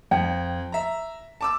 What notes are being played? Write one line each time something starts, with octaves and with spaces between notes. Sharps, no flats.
F2 G5
E5 A#5
A5 D6 E6